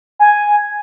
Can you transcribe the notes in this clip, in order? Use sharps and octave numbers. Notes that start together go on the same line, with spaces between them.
G#5